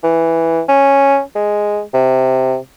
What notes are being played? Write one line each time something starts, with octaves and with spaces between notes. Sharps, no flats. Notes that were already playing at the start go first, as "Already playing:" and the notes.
E3
C#4
G#3
C3